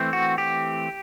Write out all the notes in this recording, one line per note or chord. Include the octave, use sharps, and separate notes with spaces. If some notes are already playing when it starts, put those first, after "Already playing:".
Already playing: E3 A3 C4
F#4
G4